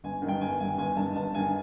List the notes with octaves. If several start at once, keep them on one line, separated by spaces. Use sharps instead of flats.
G1 G#5
D#3
G2 G5
G1 G#5
G2 D#3 G#5
G1 G#5
G2 D#3 A5
G1 A5
G2 D#3 G#5